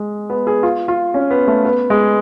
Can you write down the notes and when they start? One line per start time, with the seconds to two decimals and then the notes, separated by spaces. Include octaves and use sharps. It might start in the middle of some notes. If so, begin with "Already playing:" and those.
Already playing: G#3
0.30 B3
0.47 G#4
0.63 F4
0.88 F4
1.14 C#4
1.30 B3
1.47 A3
1.64 B3
1.90 G#3